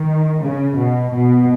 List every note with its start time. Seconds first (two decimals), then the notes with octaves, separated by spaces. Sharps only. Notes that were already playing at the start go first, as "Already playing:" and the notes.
Already playing: D#3
0.41 C#3
0.77 B2
1.13 B2